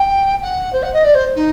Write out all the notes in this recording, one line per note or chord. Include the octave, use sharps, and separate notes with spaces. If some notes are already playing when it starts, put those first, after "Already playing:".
Already playing: G5
F#5
C5
F#5
D#5
D5
C5
D#4